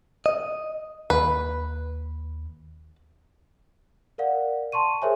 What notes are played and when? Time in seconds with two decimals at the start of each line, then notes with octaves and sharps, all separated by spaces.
0.26 D#5
1.10 D#2 B4
4.18 A#4 D5 F5 F#5
4.72 A5 C6 C#6 D#7
5.02 G#4 A#4 C5 C#5 E5 G#5